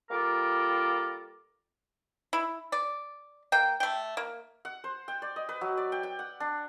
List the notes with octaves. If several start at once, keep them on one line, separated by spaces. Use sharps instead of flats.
G3 A#3 F4 A4 A#4 D6
E4
D5
A#3 G5
A3 G5
A#3
F#5
C5
G5
D5
D#5
B4
F#3
D5
G5
G5
F#5
D4